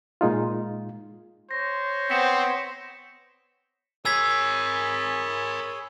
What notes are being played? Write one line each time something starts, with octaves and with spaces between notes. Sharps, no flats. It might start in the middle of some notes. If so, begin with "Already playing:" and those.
A#2 G#3 D#4 F4
C5 C#5 A#6
B3 C4 B6 C#7 E7
G#4 A#4 C#5 G#5 B5 E6 G#6 B6